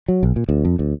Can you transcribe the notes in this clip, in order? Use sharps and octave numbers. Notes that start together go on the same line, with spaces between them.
F#3
B1
A#2
D2
F2
D2